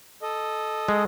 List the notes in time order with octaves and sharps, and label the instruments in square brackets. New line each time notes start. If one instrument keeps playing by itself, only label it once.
[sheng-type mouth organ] A4 D#5
[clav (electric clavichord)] G#3